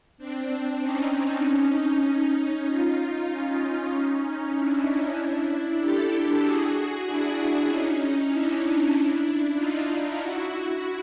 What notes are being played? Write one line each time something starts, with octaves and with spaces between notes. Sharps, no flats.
C4 D4
C#4 D#4
D#4 F4
C#4 D#4
C#4 D#4
D4 E4
G4 A4
F#4 G#4
D4 E4
C#4 D#4
D4 E4
D#4 F4
E4 F#4